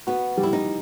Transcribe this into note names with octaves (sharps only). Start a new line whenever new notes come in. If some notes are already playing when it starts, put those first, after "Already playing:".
B3 F#4
G3
E4
D#4